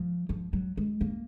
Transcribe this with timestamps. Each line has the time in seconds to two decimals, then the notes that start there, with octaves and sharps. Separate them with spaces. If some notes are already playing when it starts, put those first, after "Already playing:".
Already playing: F3
0.29 F3
0.53 F#3
0.77 G#3
1.01 A#3